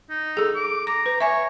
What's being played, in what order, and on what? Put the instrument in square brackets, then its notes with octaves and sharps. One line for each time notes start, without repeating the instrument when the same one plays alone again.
[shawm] D#4
[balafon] G#4 A4
[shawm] D6
[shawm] A#5 [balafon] D6
[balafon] B4
[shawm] C#5 [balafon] E5 G#5